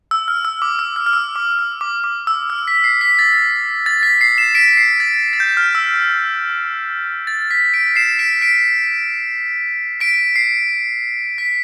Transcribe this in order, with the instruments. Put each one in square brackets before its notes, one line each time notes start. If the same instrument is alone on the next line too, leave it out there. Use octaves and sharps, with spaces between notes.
[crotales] E6
F6
E6
D6
E6
F6
F6
E6
D6
E6
D6
D6
E6
F6
B6
C7
B6
A6
A6
B6
C7
C7 E7
B6 D7
C7
A6
A6
G6
F6
E6
A6
B6
B6 D7
C7 E7
B6 D7
B6 D7
B6 D7
C7
B6